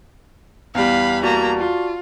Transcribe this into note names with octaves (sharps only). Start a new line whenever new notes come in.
E2 G3 F5 B5
A#3 F#4 D5 A5 A#5
F4